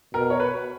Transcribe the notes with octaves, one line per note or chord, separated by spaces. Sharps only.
B2 A#4
C#5
B4